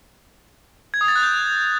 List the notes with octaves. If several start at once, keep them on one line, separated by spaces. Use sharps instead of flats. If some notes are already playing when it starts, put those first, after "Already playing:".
G#6
D#6
A6
F#6
G6